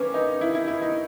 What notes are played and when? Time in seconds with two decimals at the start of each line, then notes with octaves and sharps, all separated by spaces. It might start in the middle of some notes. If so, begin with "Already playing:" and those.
Already playing: E3 G3 A#3 C#4 D4
0.14 D#4
0.41 E4
0.55 E4
0.68 E4
0.82 D#4